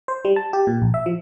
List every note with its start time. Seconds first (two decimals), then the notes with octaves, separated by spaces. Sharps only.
0.08 C5
0.25 G3
0.36 A5
0.53 G4
0.67 A#2
0.82 A#1
0.94 E5
1.06 F3